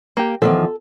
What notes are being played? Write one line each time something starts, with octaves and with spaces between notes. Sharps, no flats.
A#3 G4
E2 D#3 F3 A4